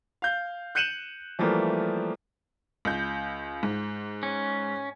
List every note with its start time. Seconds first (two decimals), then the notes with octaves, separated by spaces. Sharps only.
0.22 F5 G6
0.75 F#6 G6 C#7 D#7 E7 F#7
1.39 E3 F3 G3 A3 A#3
2.85 C#2 G6
3.63 G#2
4.23 C#4